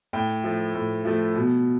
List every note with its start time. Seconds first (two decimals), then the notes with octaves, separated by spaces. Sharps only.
0.13 A2 G5
0.44 F3 A3
0.74 A2
1.05 F3 A3
1.36 B2